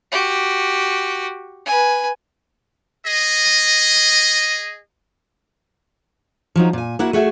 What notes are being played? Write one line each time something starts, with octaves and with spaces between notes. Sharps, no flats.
F#4 G4
B4 G#5
G#4 D#5
F3 F#3 D#4
A#2 G#5
A#3 E4 F#4 F#5
A3 F#4 G#4 E5